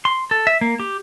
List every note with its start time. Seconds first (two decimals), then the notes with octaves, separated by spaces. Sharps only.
0.05 C6
0.31 A4
0.47 E5
0.61 A#3
0.80 G4